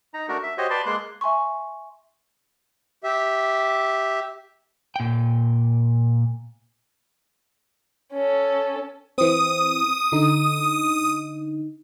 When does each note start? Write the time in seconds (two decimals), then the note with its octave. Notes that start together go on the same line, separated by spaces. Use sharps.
0.14 D#4 A#5
0.29 A3 D4 F#4 A#4
0.43 E5
0.58 F#4 G4 C5 C#5 D#5
0.70 B4 D5 A5 C6
0.86 G#3 A#3 C6 F#6
1.21 E5 G#5 C6 C#6
3.04 G4 E5
4.96 A#2 G5
8.13 C#4 A4
9.18 E3 C4 D#6
10.12 D3 D#4